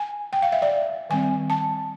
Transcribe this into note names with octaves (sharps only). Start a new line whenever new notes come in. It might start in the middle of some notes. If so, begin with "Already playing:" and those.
Already playing: G#5
G5
F5
E5
D5
D#3 G3 C4 G#5
A5